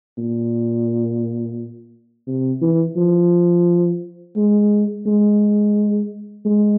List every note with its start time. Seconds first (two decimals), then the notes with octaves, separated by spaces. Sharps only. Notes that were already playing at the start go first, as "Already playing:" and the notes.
0.18 A#2
2.27 C3
2.62 E3
2.97 F3
4.37 G#3
5.06 G#3
6.45 G#3